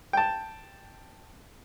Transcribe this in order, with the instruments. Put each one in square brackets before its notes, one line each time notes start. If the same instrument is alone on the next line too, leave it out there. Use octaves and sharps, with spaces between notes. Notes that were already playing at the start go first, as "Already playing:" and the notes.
[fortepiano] G5 A5